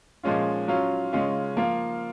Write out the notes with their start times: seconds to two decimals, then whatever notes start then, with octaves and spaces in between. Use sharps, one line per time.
0.23 A#2 F3 G#3 C#4 F4
0.68 F#3 C#4 F4
1.13 C#3 G#3 C#4 F4
1.57 F3 A#3 F4